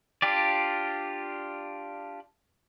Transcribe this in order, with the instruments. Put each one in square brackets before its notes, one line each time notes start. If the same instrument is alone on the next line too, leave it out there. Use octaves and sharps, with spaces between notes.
[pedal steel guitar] D4 F4 G4 D5